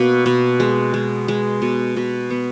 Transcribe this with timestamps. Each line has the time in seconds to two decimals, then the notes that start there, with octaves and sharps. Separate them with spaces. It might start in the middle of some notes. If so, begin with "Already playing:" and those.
Already playing: B2 A#3
0.26 B2
0.60 G#3
0.94 G#3
1.28 G#3
1.62 B2
1.96 B2
2.30 B3